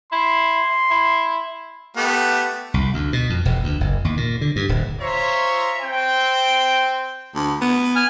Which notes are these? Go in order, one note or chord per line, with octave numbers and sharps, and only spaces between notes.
E4 C6
E4
A3 B3 G4
C2
D2
B2
F2
E1
D2
F#1
D#2
A#2
D3
G2
D1
F4 C5 C#5 E5 A#5
C4 G5
D2
B3
G#5 F6